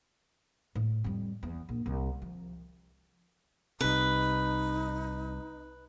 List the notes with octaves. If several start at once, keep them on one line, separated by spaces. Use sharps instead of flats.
A2
F2 G3
E2
A#1
C2
F3
C2 C3 D#4 B4